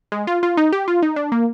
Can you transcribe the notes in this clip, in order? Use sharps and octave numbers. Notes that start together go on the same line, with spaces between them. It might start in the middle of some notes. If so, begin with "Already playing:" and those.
G#3
F4
F4
D#4
G4
F4
D#4
D4
A#3